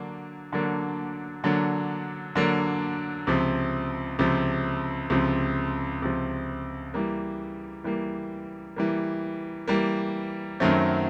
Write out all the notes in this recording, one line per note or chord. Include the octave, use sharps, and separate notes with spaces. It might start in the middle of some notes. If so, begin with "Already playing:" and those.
Already playing: D3 F#3 A#3 D4
D3 F#3 A#3 D4
D3 F#3 A#3 D4
D3 F#3 A#3 D4
C#2 C3 F3
C#2 C3 F3
C#2 C3 F3
C#2 C3 F3
E3 G3 A#3
E3 G3 A#3
E3 G3 A#3
E3 G3 A#3
F#2 D#3 F#3 A3 C4